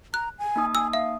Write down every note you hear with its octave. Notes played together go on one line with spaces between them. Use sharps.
A#5 F#6
G#5
A#3 D#4 D#6
G#5 E6
E5 F5